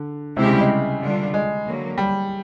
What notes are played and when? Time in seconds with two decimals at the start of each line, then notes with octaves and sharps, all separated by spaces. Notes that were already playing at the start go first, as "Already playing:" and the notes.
Already playing: D3
0.36 C3 G#3 C4 E4 G4
0.45 C#3
0.53 G3
0.61 G#3
1.01 D3 G3 B3 D4 F4
1.34 G#3
1.66 D3 F#3 A#3
1.98 G3